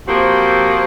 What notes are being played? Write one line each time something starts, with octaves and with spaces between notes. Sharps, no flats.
F3 A#3 C4 F#4 G4 C5